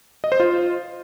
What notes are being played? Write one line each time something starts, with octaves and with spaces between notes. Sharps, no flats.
D#5
C5
F4